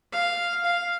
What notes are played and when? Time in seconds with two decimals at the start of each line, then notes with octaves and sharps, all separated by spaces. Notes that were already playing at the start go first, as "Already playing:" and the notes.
0.12 F5
0.65 F5